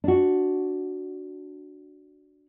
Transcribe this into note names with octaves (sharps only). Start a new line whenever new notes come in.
D4 F#4